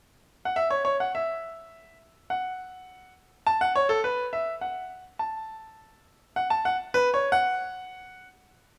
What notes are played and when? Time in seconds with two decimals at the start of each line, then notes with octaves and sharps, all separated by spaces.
0.45 F#5
0.56 E5
0.70 C#5
0.85 C#5
1.00 F#5
1.15 E5
2.30 F#5
3.47 A5
3.61 F#5
3.76 C#5
3.89 A4
4.04 B4
4.33 E5
4.61 F#5
5.19 A5
6.36 F#5
6.50 A5
6.65 F#5
6.94 B4
7.14 C#5
7.32 F#5